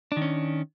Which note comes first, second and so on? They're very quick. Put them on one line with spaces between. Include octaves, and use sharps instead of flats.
D4 D#3 C#4